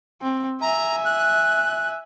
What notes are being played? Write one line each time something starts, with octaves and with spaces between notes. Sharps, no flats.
C4
E5 G#5 A#5
F#6